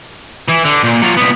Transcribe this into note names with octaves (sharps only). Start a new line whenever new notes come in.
E3 E4
D3
A#2
F#3 F4
C2 B3